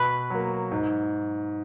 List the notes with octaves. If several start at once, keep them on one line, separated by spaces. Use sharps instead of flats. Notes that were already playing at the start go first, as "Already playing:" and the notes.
Already playing: B2 B4
F#3 A#3
G#2